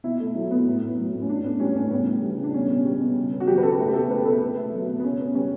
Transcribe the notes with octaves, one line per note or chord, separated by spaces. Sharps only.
B2 E4
A3
F#3 E4
B2 B3
A2
B3
F#3
A2
C#4
A2 D4
B3
G3 C#4
A2 C#4
C#3 B3
B3
G3
C#3
D4
B2 C#4
B3
G3
B2
C#3
B3
F#4
F#3 G4
B4
C#3 A4
A3
G4
B2 A4
A3 B4
B2 A4
B2 B3
A3
F#3
B2
B3
C#3 C#4
B3
G3 C#4